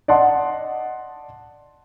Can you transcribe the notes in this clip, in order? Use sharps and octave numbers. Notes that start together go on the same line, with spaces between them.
D5 D#5 F#5 A5 C6